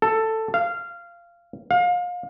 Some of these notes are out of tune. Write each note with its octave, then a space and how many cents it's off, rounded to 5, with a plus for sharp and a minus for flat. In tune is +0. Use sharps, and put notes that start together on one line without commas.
A4 +10
F5 -15
F5 +35